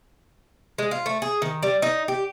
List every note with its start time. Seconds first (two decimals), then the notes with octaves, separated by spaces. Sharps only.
0.78 G#3
0.91 F4
1.06 A3
1.22 G#4
1.42 D#3
1.63 G3
1.82 D#4
2.08 G4